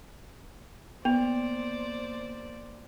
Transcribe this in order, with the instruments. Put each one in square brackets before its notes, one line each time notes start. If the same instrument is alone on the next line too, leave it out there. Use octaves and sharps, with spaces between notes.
[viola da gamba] A#3 C5 D5 [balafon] B3